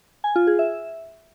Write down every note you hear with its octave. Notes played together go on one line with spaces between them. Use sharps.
G#5
F4
G#4
E5